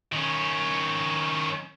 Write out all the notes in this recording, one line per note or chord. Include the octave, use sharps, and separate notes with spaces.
D#3 C#4